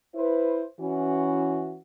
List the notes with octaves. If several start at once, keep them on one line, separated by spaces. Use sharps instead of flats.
E4 B4 C5
E3 C#4 F#4